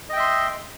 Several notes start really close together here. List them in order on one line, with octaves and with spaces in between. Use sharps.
D#5 G5 E5 C6